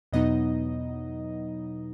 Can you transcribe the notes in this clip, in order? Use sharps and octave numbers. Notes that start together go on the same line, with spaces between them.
E2 B2 F#3 B3 D#4 D#5